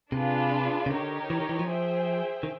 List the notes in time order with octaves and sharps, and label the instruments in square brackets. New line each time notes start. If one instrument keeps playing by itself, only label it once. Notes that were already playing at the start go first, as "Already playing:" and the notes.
[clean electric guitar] C3 [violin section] D4 F4 G#4 B4
[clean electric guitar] C#3
[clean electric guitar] D3 [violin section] D#4 G4 A#4 C#5
[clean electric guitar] E3
D#3
E3
F3
[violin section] G#4 C5 E5 G5
[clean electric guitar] D#3